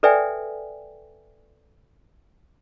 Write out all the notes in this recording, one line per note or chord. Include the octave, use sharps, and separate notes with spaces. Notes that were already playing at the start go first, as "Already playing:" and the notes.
A4 B4 D5 E5 G5 G#5